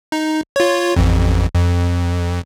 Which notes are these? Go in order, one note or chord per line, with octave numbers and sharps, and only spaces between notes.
D#4
F4 C#5
A1 F2
F2